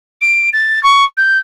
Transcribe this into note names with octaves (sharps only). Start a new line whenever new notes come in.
D7
A6
C#6
G6